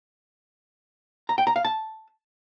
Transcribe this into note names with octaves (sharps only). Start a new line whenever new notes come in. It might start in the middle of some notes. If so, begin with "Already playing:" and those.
A#5
G5
A#5
F5
A5